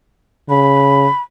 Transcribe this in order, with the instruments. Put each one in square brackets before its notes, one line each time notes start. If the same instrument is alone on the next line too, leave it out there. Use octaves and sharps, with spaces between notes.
[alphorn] C#3 [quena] B5